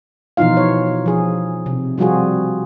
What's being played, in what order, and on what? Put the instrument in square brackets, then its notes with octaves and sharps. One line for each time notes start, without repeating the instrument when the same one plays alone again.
[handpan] B2 E3 F3 D#4 F4 F5
C#5
F3 G#4
C3
F3 G3 C4 F4 F#4 G#4